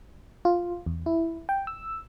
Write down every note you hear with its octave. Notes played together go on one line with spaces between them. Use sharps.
F4
E2
E4
G5
E6